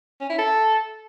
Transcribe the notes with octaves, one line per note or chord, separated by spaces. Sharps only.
C#4
E4
A4